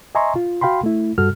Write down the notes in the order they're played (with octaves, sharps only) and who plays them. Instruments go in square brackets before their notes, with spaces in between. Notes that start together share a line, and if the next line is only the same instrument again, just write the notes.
[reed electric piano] D#5 E5 G#5 A#5 C6 C#6
F4
F#4 F5 G5 B5 C6
A3 E4
G2 G3 F#4 A4 F6